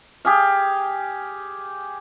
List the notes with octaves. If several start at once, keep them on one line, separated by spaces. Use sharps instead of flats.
G4 G#4 F5